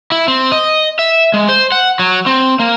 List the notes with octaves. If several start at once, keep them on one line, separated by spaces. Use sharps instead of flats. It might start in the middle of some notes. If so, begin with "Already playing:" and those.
E4
C4
D#5
E5
G#3
C5
F#5
F#3
C4
A#3